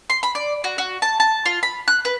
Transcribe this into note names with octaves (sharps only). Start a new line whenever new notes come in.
C6
B5
D5
F#4
F#4
A5
A5
F4
B5
F#6
B4